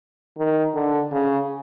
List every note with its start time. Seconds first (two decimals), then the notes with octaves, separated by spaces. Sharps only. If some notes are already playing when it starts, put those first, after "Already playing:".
0.37 D#3
0.75 D3
1.11 C#3